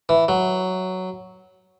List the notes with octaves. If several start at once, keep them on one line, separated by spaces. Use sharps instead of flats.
E3
F#3